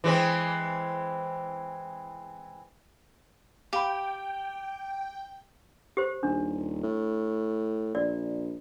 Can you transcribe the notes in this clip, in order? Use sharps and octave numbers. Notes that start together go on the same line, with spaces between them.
E3 G#3 C4
G4 F5 G5 B5
G4 C5
D#1 D4
A2
A#1 D5